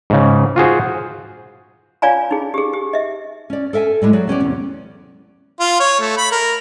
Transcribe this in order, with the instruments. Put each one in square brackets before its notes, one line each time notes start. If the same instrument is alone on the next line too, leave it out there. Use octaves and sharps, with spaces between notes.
[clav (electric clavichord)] G#2 C#3
F4 F#4 G#4 C5
[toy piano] F4 C#5 D5 F5 G#5 A#5
D#4 G#4
G4 G#4
G4
D#5 E5
[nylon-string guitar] C#4 D5
A4 A#4 E5 F5 G#5
A2 G3 G#3 E4
F#3 G#4 D5
B3 C#4 G4 D5
E2 C3 C#4
[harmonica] F4
C#5
A3
B5
A#4